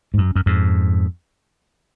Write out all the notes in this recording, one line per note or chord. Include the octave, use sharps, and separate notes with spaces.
G#2
F#2
F#2
F2 G#2